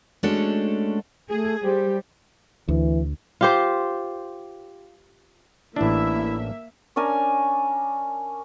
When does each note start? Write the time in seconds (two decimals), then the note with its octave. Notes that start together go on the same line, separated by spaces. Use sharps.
0.23 G#3 A3 C#4 D4 F#4 A4
1.30 A3 G#4
1.63 G3 G4 C5
2.68 D2 E3
3.41 F4 G4 C5
5.76 A1 A#3 D4 E4 E5
6.96 C#4 D4 A#4 G#5